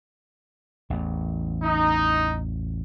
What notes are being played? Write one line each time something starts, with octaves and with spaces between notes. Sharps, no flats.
A1 E2
D#4